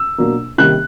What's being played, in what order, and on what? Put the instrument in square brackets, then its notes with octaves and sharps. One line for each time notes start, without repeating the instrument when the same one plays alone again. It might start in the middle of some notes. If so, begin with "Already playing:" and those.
Already playing: [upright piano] E6
B2 F#3 A#3 D4
C3 D#3 G3 A#3 C#4 F#6